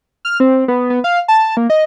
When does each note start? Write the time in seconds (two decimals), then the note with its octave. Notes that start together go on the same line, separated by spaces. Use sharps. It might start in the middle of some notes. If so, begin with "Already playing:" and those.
0.25 F6
0.40 C4
0.68 B3
0.90 B3
1.04 F5
1.28 A5
1.57 A#3
1.70 D#5